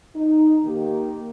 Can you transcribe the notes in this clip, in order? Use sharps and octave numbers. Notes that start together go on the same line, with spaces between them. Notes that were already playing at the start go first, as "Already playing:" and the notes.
D#4
D#3 A#3 G4